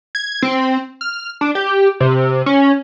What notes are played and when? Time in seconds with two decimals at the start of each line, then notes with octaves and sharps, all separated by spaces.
0.15 G#6
0.42 C4
1.01 F6
1.41 D4
1.55 G4
2.00 C3
2.46 C#4